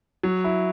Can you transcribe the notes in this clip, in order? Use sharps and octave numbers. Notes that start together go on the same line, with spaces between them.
F#3
E4